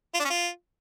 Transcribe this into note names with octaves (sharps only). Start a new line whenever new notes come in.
F4
D4
C#4
F4